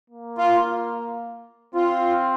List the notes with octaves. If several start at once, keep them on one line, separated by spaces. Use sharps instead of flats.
A#3
F4
C4 F4